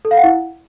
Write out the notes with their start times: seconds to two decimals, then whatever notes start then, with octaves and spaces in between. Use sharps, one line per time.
0.05 A4
0.11 F5
0.17 F#5
0.24 E4